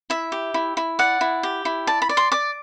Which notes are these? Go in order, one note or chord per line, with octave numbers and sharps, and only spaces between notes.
E4 E5
G4
E4
E4
D5 F#5
E4
G4
E4
D5 A5
B5
D5
C6
D5 D6